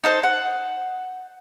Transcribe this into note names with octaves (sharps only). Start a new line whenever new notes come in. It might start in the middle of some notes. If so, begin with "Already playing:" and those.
D#4 A4 C5
F#5